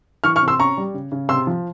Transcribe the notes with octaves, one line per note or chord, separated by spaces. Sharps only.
E3 C#6 F6
C#6 F6
C3
C6 E6
C#4 A#5 C#6
G3
C#3
C#3
C3 C6 E6
F3